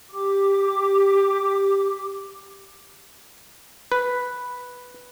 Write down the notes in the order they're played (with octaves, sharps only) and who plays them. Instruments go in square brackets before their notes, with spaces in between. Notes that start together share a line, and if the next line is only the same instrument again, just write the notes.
[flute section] G4 D6
[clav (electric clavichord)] B4